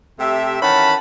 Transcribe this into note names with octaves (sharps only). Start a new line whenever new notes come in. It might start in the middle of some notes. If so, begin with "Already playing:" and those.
C3 A3 G4 E5
D#3 E3 C#4 F#5 A5 B5